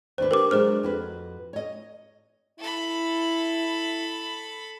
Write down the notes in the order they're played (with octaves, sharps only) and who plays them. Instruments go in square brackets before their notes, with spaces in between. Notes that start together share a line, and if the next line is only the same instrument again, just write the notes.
[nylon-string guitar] D#2 D4 B4 [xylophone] C5
[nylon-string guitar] G4 [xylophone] A#4 B4 D6
[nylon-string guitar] F#3 G#3 D4 [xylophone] G#4 C5 F6
[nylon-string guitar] F2 F#4 B4
C#5 D#5
[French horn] E4 [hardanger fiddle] A4 B5